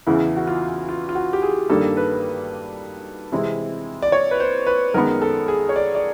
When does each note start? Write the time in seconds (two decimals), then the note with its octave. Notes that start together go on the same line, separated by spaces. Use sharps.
0.07 E2 C#3 E3 E4
0.36 F#4
0.47 F4
0.89 F4
1.09 F4
1.15 F#4
1.33 G4
1.42 G#4
1.70 G2 D#3 G3 A#3 D4 A4
1.97 B4
3.32 C3 E3 G#3 C4 E4
4.02 D5
4.12 C#5
4.31 B4
4.40 C5
4.67 B4
4.94 F#2 D#3 G#3 B3 A#4
5.22 A4
5.48 G#4
5.69 C#5
5.76 D5
5.95 D5